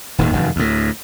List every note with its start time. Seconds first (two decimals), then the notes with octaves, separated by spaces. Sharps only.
0.18 D#1 D#2 A2 D#3
0.33 F1 F#2 D#3
0.56 D2 A2